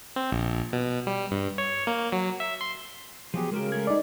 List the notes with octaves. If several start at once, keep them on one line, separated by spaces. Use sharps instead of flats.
C4
A#1
B2
G3
G2
C#5
A#3
F#3
E5
C6
F3 F#3 B3 G4 G#4
C#3 G#3 F#4 G4 A#4
G#3 A3 G#4 G#6
D#4 D5